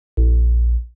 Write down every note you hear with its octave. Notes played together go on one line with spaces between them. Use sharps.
A#1